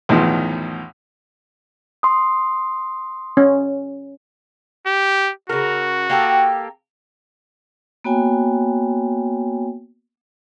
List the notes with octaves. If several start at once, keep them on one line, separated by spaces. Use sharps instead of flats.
B1 E2 A2 D#3 F3
C6 D#6
C#4
G4
C#3 F#4 A#4
A#3 G4 A4
A#3 B3 F#4 C#5 G5 G#5